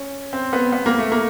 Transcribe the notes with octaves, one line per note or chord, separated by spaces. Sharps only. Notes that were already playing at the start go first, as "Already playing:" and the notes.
Already playing: C#4
C4
B3
B3
A#3
A3
A#3